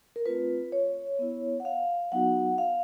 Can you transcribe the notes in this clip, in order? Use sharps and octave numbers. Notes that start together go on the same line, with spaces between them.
A#4
A3 C4 F4 B4
C#5
B3 E4
F#5
F5
F#3 B3 D#4 F#4 F#5
F5